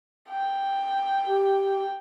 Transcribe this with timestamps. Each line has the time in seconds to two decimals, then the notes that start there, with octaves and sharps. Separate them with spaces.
0.29 G5
1.27 G4